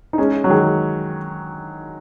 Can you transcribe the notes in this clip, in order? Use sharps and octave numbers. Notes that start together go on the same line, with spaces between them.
D#4
G#3 C#4
F#3
D#3 G#3